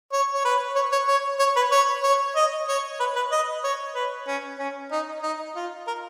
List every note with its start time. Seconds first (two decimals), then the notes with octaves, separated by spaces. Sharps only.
0.12 C#5
0.33 C#5
0.45 B4
0.75 C#5
0.92 C#5
1.07 C#5
1.39 C#5
1.56 B4
1.72 C#5
2.03 C#5
2.35 D#5
2.68 C#5
3.00 B4
3.16 B4
3.31 D#5
3.64 C#5
3.95 B4
4.27 C#4
4.59 C#4
4.91 D#4
5.23 D#4
5.56 F4
5.87 A#4